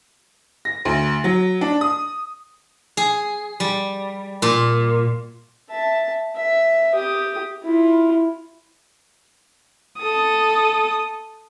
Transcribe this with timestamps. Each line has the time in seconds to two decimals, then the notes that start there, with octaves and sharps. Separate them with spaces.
0.65 A#6
0.85 D2
1.24 F#3
1.61 D4
1.81 D#6
2.97 G#4
3.60 G3
4.42 A#2
5.70 E5 A5
6.36 E5
6.94 G4 D#6
7.63 E4 F4
9.99 A4 D#6